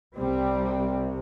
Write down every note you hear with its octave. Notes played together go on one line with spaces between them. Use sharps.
C2 C3 G3 C4